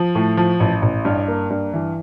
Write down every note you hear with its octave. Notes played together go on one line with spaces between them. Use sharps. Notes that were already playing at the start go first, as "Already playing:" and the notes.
Already playing: F3
A2
F3
A1
A1
G2
A#3
G2
E3